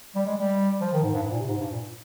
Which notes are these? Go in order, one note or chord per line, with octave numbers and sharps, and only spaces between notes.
G3
G#3
G3
F3
D#3
G#2
G2
G#2
A#2
C3
G#2
G2
A#2